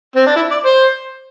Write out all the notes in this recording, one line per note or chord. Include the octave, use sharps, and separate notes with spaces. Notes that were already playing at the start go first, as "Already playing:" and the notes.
C4
D4
E4
D5
C5